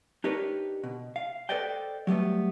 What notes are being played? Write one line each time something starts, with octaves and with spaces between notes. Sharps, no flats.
D4 D#4 G4 A#4 B4 C#5
B2
F5
A4 B4 C5 D5 D#5 G5
F#3 G3 A3 B3